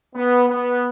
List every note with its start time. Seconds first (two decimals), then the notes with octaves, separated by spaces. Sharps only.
0.16 B3
0.49 B3